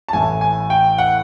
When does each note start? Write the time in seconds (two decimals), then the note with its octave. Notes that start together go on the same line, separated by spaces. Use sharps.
0.08 A5
0.13 A1 A2 E3 G#5
0.41 G#5
0.70 G5
0.98 F#5